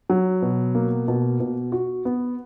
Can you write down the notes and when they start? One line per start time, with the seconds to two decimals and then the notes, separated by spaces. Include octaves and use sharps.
0.10 F#3
0.42 B2
0.75 A#3
1.08 B2
1.40 B2
1.72 F#4
2.05 B3